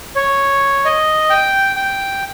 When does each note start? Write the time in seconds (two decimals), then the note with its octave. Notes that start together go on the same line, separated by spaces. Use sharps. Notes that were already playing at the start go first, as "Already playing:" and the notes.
0.16 C#5
0.85 D#5
1.30 G5
1.76 G5